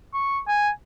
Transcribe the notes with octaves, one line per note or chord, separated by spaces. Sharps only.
C#6
G#5